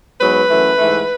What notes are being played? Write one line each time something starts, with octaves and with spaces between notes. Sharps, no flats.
G#2 F#3 B3 B4
F#2 E3 A3
G#2 E3 A3